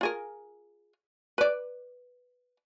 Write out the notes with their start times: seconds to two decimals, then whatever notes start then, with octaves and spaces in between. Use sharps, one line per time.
0.01 F4 G#4 A#4
1.38 B4 D5